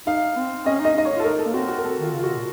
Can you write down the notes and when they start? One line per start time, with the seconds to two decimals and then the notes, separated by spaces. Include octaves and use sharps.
0.07 D#4 F5
0.36 C4
0.66 C#4 D#5
0.80 D#4 D#5
0.95 D#4 D#5
1.05 C#5
1.16 F4 A4
1.24 D#4 A#4
1.39 A4
1.46 A#3
1.54 C4 F#4
1.68 F#4
1.78 A#4
1.84 A4
1.99 D#3 F4
2.13 C#3
2.19 F4
2.23 C3 F#4
2.37 A#2